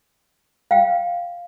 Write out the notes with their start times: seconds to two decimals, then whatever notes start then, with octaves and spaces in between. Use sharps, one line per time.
0.71 F5 G5